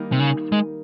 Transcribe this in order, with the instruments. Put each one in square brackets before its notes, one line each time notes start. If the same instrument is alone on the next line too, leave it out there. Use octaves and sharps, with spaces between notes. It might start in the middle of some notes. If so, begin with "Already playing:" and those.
Already playing: [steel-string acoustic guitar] D#3 G3 A#3 D#4
[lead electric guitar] C3
C#3
G#3